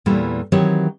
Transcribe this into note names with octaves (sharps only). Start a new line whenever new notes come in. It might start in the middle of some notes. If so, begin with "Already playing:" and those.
E2 A#2 E3 G3 A3
D#3 E3 F#3 C4 G4 C#5